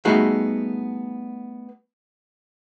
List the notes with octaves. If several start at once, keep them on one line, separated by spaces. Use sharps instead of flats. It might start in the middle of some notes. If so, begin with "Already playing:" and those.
G3 A3 B3 D#4 F#4 G#4